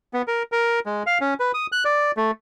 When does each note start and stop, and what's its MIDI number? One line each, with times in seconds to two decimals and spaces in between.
0.13 0.22 59
0.28 0.43 70
0.52 0.80 70
0.86 1.03 56
1.06 1.18 77
1.21 1.34 61
1.40 1.52 71
1.54 1.67 87
1.72 1.84 90
1.85 2.11 74
2.17 2.31 57